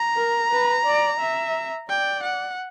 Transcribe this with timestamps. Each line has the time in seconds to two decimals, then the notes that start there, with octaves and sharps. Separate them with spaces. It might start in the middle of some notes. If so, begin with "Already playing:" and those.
Already playing: A#5
0.17 A#4
0.52 B4
0.86 D5
1.20 E5
1.89 D5 G5
2.23 F#5